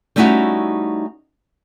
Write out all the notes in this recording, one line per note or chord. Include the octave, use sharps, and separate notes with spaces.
G3 A3 C#4 D#4 E4 F#4